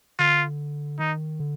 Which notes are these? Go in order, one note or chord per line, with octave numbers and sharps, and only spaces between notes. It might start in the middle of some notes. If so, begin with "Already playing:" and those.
D3 F4
D#3 D#4
D3